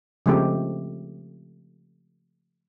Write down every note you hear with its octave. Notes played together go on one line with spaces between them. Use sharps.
C#3 F3 G#3 A3 C4 G4